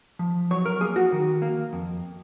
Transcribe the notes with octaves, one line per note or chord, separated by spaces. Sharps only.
F3
F#3 C#5
A#4
A#3 G#4
F#4
D#3
A#3
F2